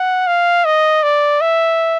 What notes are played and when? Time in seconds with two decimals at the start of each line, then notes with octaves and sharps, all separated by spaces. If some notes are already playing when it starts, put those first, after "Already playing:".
Already playing: F#5
0.27 F5
0.65 D#5
1.03 D5
1.41 E5